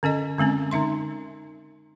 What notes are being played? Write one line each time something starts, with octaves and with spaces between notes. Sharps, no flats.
D3 C#4 A4 D#5
D3 G#3 C4 C#4
D3 D#4 E5 C6